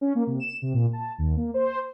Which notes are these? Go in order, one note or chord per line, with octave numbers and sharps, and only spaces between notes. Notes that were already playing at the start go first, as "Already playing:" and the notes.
C#4
A#3
C3
E7
C3
A#2
A5
D#2
A#3
C5